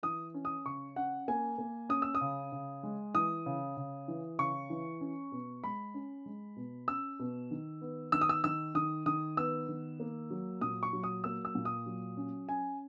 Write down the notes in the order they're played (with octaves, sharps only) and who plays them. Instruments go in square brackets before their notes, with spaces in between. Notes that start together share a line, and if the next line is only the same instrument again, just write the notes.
[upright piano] E3 D#6
C#4
D#6
C#3 C#6
C#4 F#5
A#3 G#5
A#3
C#4 D#6
E6
D#6
C#3
C#3
G#3
E3 D#6
C#3
C#3
E3
C#3 C#6
E3
C#4
B2
G#3 B5
C#4
G#3
B2
C#4 E6
B2
D#3
B3
D#3 E6
D#6
E6
D#3 E6
D#3 D#6
D#3 D#6
B3 E6
D#3
A#3
F#3
A#2 D#6
C#6
F#3
D#6
A#3 E6
E6
A#2
D#6
F#3
C#4
C#4 G#5